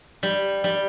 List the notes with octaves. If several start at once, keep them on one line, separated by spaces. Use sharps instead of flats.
G3
G3